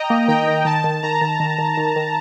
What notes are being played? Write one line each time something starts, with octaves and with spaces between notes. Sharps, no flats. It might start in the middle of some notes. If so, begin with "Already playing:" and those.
Already playing: D#5 G5 A#5
A#3
D#3 G5
D#3
D#3 A5
D#3
D#3 A#5
D#3
D#3
D#3
D#3
D#3